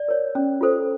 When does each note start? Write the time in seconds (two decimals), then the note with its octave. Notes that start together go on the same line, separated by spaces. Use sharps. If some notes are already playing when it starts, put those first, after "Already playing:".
Already playing: D5
0.08 A#4 C#5
0.35 C#4
0.61 F4 A4 C5